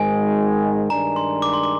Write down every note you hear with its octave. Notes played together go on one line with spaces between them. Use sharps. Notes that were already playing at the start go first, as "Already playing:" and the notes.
Already playing: G#1 G#2 D#3 G#3 G#5
G2 D#3 G#3 D4 A#5
C6
D6
C6
D6